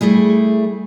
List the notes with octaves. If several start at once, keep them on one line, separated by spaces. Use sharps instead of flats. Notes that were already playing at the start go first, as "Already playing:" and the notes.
G3 A3 E4 G#4